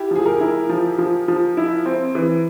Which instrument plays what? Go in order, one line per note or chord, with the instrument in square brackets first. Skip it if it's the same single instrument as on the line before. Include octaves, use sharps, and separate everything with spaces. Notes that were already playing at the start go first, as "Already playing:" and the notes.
Already playing: [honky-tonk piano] E4 [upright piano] G4
[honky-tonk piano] F3 [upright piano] G#4
[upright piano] A#4
[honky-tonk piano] E4
F3
F3
F3
E4
C4
E3